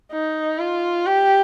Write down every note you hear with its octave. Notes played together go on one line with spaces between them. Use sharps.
D#4
F4
G4